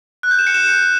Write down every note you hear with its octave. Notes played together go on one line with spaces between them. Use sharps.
F#6
G6
E7
C#7
E7